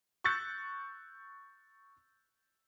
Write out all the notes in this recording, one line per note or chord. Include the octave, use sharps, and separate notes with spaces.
C#6 E6 F#6 G6 A6 C#7